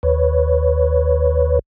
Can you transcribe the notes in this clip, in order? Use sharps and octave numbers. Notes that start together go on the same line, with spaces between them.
D#2 B4 C#5